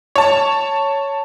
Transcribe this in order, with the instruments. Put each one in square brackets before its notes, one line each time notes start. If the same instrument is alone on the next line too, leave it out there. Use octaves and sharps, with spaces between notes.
[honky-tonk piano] C#5 A5